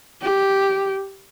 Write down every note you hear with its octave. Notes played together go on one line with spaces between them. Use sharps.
G4